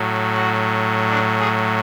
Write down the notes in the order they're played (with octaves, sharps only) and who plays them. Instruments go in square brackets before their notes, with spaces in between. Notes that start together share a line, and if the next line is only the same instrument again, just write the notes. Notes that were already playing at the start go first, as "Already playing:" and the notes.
Already playing: [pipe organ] A2 F#3
F#4
D4
G#4